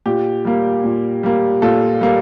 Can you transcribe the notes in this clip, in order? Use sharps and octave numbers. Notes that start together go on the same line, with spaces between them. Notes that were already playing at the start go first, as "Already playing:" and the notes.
A#2 G4
G3 A#3
A#2
G3 A#3
A#2 F4 A4
G3 A#3